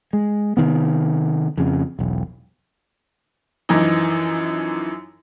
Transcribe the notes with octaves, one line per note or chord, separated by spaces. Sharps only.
G#3
C3 D#3 B3
F2 C#3
E1 B1
F#2 E3 F3 D#4